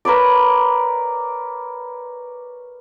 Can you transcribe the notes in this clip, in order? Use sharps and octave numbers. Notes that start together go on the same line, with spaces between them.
A#4 B4 C#5 D5